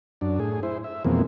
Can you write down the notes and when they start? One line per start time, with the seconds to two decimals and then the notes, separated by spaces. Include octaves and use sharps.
0.21 F#2 D4
0.39 A2 G#4
0.63 E4 C5
0.84 E5
1.04 F2 B2 E3 G#3 A#3 C4